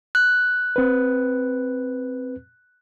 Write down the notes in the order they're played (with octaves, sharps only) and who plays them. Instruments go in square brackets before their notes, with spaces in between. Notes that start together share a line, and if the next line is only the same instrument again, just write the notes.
[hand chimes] F#6
[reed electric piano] C4 B4